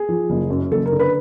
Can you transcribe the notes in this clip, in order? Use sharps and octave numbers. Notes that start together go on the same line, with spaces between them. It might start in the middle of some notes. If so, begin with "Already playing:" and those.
Already playing: G#4
F3
F#1
F#2
F#1 A4
A#4
D3
B4